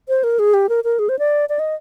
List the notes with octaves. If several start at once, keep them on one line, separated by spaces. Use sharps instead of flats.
C5
A#4
G#4
G4
A#4
A#4
G#4
C5
D5
D5
D#5